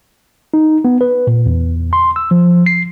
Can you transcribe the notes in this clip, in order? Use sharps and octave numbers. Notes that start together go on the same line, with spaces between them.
D#4
B3
B4
A#2
E2
C6
E6
F3
C7